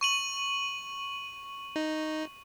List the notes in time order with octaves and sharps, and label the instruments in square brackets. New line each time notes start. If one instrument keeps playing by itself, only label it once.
[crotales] C#6 D#7 F#7
[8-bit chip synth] D#4